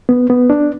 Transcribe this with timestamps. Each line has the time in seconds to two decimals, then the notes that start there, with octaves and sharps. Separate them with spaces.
0.09 B3
0.30 B3
0.50 D4